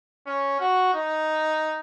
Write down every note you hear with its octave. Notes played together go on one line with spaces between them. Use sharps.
C#4
F#4
D#4